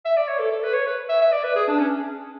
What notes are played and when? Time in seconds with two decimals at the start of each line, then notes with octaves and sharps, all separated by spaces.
0.05 E5
0.16 D5
0.28 C#5
0.39 A4
0.52 A4
0.63 B4
0.74 C#5
0.86 B4
1.09 E5
1.21 E5
1.32 D5
1.44 B4
1.56 G#4
1.68 D4
1.79 C#4